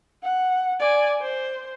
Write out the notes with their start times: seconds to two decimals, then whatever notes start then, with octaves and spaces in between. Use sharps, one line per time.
0.23 F#5
0.80 D5 G#5
1.21 C5